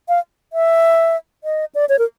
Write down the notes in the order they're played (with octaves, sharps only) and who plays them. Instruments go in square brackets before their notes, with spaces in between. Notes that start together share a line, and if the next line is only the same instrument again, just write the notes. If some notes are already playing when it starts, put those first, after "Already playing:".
[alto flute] F5
E5
D#5
D5
C#5
A#4